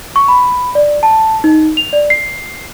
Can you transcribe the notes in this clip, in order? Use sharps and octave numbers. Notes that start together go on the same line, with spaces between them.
C#6
B5
D5
A5
D#4
F7
D5
C7